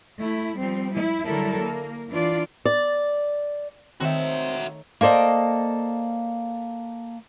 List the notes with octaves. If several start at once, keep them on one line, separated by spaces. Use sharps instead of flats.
A3 E4
F3 G3 C4
E4
D3 F#3 G3 E4 A4 A#4
A#3
E3 D4 F4 D5
D5
D#3 A3 C4 F#4 C#5 E5
A#3 A4 C5 D5 D#5